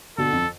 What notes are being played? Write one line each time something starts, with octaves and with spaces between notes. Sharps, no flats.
B2 D3 A4
F2